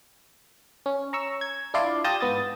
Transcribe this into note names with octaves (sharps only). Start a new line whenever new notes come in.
C#4
A#5 C#6 E6
G#6
D4 E4 F4 D5 C6
F4 G4 A5 D#6 G6 A#6
G#2 B3 D#6 A6